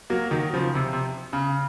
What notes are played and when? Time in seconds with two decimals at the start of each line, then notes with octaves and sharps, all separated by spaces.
0.10 F#3 A#3
0.31 D#3 F#3
0.53 C#3 F3
0.75 C3
0.93 C3
1.33 C#3